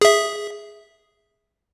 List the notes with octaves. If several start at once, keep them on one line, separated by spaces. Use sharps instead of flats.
G#4 E5